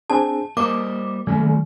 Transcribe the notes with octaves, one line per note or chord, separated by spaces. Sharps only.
C4 D4 G#4 A5
G3 A#3 C5 D#5 D6
C2 D#3 F#3 A3